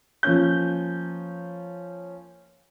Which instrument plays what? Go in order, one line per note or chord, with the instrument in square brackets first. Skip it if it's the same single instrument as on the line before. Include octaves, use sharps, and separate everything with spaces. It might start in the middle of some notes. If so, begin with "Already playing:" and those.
[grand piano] F3 A#3 C#4 G6